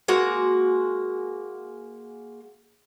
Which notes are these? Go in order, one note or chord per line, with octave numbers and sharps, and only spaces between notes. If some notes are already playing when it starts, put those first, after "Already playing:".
G#3 A#3 F#4